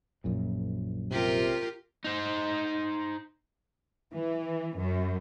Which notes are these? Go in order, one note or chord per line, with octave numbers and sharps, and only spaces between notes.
A#1 F#2 A#2
C3 F4 G4 A#4
D#4 C5
E3
F#2